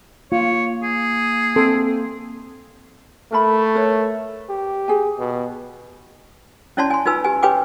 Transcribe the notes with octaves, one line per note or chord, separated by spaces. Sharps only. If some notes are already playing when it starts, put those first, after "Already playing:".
A#3 F4 C#5
G#4
C4 A4
A3 A#4 A5 B5
A#4 B4 C#5
G4
G#4 G#5
B2
C#4 E4 C#5 D5 A5 C6
G#5 C6
D#4 F4 B4 E6
G4 G#5
G4 B4 C#5 G5 G#5 D6